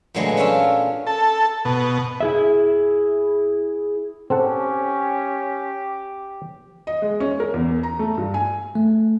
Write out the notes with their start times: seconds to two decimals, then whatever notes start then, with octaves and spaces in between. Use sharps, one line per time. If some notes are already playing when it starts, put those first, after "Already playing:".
0.14 A#2 D3 F#3 G#3 A3 B3
0.37 C#4 D4 F4 A#4 C#5 E5
1.07 A4
1.65 B2
2.21 E4 G#4 E5
4.30 C4 C#4 G4 A4 F#5
6.87 D#5
7.02 G#3
7.20 C#4
7.40 A#4
7.54 E2
7.83 A#5
7.99 A3
8.18 G2
8.34 G#5
8.75 A3